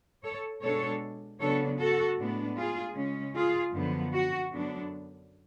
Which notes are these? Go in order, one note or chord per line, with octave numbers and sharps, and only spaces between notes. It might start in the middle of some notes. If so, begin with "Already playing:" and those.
A4 C#5
B2 G#3 D4 A4 C#5
C#3 F#3 B3 D4 A4 C#5
F#4 A4
A2 G#3 B3 D4
F4 G#4
C#3 G#3 C#4
F4 G#4
F#2 D3 F3 B3
F#4
F#2 D3 F#3 B3 D4